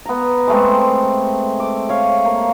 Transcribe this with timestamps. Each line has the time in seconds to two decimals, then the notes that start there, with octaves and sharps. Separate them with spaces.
0.06 B3 A#5
0.48 G#3 A3 C4
1.60 D6
1.89 C#5 F5
2.25 A#3